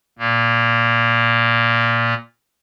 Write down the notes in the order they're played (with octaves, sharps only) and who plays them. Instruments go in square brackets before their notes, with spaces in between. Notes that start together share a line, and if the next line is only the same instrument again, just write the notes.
[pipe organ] A#2 A#3